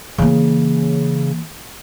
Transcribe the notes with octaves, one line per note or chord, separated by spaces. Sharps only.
C#3 E3 A#3